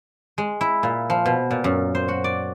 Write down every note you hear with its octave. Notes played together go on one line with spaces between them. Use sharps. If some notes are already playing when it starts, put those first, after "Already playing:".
G#3
E4
A#2
F3
B2
A#2
F#2
C5
F#4
D5